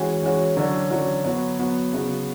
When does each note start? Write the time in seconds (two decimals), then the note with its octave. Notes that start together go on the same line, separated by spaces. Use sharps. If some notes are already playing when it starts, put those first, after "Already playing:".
Already playing: E3 G#3 C#4 F#4
0.22 E3 G#3 C#4 F#4
0.57 D3 F#3 C#4 F#4
0.90 D3 F#3 C#4 F#4
1.25 F#3 B3 F#4
1.59 F#3 B3 F#4
1.93 C#3 F#3 B3 F#4